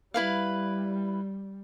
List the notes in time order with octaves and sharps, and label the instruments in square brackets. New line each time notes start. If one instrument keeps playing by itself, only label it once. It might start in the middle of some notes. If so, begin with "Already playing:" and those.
[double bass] G3 [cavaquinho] E4 B4 F5